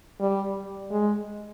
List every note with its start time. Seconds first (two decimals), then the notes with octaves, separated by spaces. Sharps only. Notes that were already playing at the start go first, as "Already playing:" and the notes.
0.20 G3
0.91 G#3